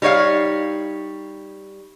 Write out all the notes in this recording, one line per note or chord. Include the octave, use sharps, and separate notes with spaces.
G3 D#4 C#5 D#5 F5